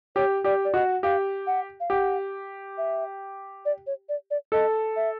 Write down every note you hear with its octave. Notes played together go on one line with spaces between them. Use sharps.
G4 C#5
G4 D5
D5
F#4 D#5
G4 F5
F#5
F5
G4 F#5
E5
D5
C#5
D5
D5
A4 D#5
E5